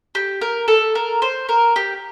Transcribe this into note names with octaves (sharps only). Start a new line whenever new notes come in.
G4
A#4
A4
A#4
C5
A#4
G4